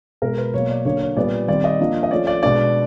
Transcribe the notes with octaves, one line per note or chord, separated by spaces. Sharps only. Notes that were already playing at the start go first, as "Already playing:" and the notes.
B2 G#3 B3 A#4
B4
B2 F#3 A#3 C#5
D5
D3 F#3 A#3 D4 C#5
C#5
A#2 G3 B3 D5
D#3 G3 C4 D5
D#5
F3 A#3 D4
D#5
F3 A3 C#4 D5
D5
B2 G#3 B3 D4 D5